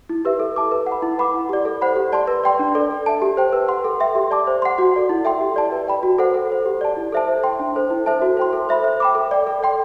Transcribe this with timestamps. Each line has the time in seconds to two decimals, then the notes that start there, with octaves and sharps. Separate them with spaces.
0.09 E4
0.25 G4 B4 E5
0.40 A4
0.56 E5 A5 D6
0.71 B4
0.86 F#5
0.92 B5
1.02 E4
1.18 B4 F#5 B5 D6
1.34 E4
1.49 G4 D5
1.65 A4
1.81 C5 F#5 B5
1.96 G4
2.12 D5 A5 C6
2.28 B4
2.44 D5 G5 C6
2.59 D4
2.75 A4 D5
2.91 A4
3.06 E5 A5
3.22 G4
3.37 C5 G5
3.53 B4
3.68 F#5 C6
3.84 A4
4.00 E5 G5 C6
4.15 G4
4.31 D5 A5 D6
4.47 C5
4.62 F#5 C6
4.78 F#4
4.94 A4 D5 F#5
5.09 E4
5.25 A4 E5 G5 C6
5.41 G4
5.56 D5 A5
5.72 B4
5.87 D5 G5 B5
6.03 F#4
6.18 A4 C5 F#5
6.34 A4
6.50 C5 F#5
6.66 G4
6.81 D5 A5
6.97 E4
7.12 A4 C5 E5 A5
7.28 C5
7.44 G5 C6
7.60 D4
7.75 A4 C5
7.90 E4
8.06 A4 C5 E5 A5
8.22 F#4
8.37 C5 G5 C6
8.53 A4
8.69 C5 E5 B5
8.84 C5
9.00 G5 B5 D6
9.15 A4
9.31 D5 G5
9.47 A4
9.63 D5 G5 C6